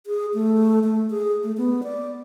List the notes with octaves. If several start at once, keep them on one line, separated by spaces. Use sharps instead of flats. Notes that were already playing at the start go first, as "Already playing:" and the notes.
G#4
A3
A3
G#4
A3
B3
D5